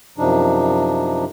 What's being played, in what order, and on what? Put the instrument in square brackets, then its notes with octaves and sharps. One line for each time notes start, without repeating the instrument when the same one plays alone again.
[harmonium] F#2 C3 F3 D4 D#4